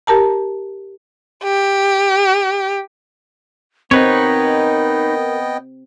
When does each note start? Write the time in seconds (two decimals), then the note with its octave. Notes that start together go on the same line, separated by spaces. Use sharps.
0.07 G4 A#4 A5 A#5
1.43 G4
3.91 B3 C4 D#4 A#4 B4 C#5 D#5 G5